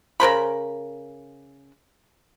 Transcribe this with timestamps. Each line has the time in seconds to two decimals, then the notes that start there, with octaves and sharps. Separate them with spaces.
0.20 C#3 A#4 C5 B5